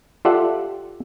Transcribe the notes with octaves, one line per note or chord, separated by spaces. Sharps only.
F4 G4 A4 D5 E5 F#5